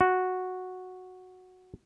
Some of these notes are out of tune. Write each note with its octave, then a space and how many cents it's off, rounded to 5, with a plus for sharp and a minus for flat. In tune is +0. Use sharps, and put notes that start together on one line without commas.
F#4 -5